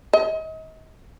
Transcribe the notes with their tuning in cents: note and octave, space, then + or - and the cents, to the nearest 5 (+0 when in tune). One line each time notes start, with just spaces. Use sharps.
D#5 +35